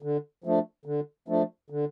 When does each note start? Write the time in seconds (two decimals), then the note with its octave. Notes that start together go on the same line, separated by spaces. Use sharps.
0.02 D3
0.44 F3 A3 D4
0.86 D3
1.28 F3 A3 D4
1.70 D3